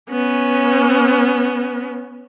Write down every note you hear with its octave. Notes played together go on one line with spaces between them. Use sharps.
B3 C#4